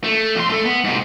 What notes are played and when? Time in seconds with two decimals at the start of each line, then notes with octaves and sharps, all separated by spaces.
0.04 A3
0.35 F2 C6
0.50 A3 A4
0.65 B3
0.84 G#2 C3